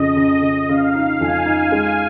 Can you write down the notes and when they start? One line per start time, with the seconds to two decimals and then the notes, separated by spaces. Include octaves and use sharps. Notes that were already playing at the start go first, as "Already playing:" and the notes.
Already playing: F2 C#3 D#5
0.16 C#3
0.42 C#3
0.68 C#3 F5
0.95 D#4
1.20 F2 G#5
1.46 D#4
1.72 G#3